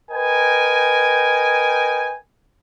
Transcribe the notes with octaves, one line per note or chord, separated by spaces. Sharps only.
A#4 B4 D#5 G5 G#5